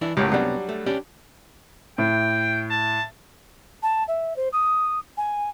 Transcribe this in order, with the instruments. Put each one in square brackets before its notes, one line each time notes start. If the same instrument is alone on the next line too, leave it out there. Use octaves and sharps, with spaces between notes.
[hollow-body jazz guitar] E3 D4 E4
[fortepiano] C#2 F#2 A2 [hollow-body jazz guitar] G4
[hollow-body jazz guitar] C3 B3 [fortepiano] F#3 G3 D4
[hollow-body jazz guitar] A3
C#4 D4 G4
[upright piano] A2 [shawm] G5
[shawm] A5
[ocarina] A5
E5
C5
D#6
G#5